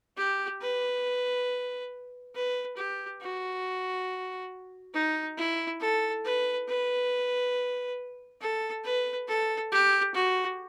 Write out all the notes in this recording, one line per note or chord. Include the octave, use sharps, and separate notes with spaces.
G4
B4
B4
G4
F#4
D#4
E4
A4
B4
B4
A4
B4
A4
G4
F#4